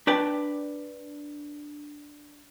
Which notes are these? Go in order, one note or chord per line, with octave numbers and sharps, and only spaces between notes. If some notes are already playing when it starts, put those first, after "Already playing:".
D4 B4 G5 A5